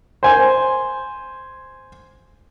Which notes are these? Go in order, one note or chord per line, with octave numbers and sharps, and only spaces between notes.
C5 G#5